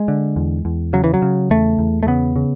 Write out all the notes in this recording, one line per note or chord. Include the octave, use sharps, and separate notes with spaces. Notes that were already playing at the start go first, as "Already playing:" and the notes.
Already playing: G#3
D3
E2
E2
C#3 F#3
E3
F#3
C#3
E2 A3
E2
A3
C#3 B3
C#3